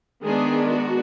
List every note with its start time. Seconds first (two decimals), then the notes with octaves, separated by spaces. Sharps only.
0.23 D#3 G#3 B3 D4 G#4
0.71 F#4